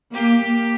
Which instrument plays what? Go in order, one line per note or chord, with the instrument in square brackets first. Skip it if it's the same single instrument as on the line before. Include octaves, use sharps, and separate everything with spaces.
[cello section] A#3 [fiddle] G4
[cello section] A#3